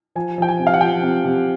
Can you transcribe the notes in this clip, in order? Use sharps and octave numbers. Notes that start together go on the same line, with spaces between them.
F3 G#5
F3 G5
G#5
C3
F5
F#5
F3 G5
C3
C3